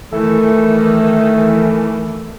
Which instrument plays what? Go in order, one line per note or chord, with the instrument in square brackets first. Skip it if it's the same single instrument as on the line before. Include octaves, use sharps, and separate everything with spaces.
[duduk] D#3 [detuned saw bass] E3 [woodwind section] A3 [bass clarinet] A4